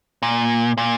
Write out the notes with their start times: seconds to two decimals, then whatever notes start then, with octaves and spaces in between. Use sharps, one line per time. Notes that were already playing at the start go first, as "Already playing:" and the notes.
0.22 A#2
0.77 A#2